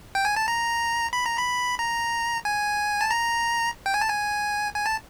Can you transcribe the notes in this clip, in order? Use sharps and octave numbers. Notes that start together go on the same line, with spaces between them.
G5
G#5
A5
A#5
B5
A#5
B5
A#5
G#5
A5
A#5
G5
G#5
A5
G#5
G#5
A5